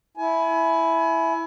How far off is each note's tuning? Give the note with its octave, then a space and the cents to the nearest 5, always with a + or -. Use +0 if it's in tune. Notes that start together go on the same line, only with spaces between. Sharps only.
E4 +0 G#5 +30